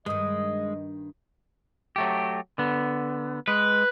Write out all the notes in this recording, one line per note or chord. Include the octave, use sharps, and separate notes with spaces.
G2 D#3 G#3 D#5 D#6
F#3 A3 G4
D3 B3
G#3 B4